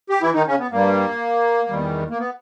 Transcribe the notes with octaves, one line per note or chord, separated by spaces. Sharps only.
G4
E3 E4
D#3 D#4
C#3 C#4
B3
G2 G3 A#3
E2 D#3 G3
A#3
B3